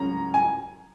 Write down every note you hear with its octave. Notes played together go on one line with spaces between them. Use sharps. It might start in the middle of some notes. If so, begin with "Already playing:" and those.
Already playing: C#2 C#3 F#3 C#4 A#5
G#5